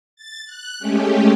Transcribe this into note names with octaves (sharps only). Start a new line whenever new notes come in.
A6
F#6
G#3 A3 C#4 G4